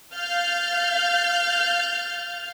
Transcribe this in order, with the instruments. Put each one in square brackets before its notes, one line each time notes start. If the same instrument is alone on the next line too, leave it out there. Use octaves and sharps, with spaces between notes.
[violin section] F5 F6 G6 A6